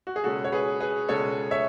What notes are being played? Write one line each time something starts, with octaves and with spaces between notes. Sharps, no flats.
F#4
G#4
C#2 B2 G#3 C#4 F#4 A4
C#5
G#4 B4
G#4 B4
C#2 B2 G#3 C#4 A4 C#5
C#5 E5